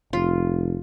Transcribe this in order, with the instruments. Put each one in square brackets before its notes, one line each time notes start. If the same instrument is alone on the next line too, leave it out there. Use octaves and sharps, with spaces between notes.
[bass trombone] F1 [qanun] F4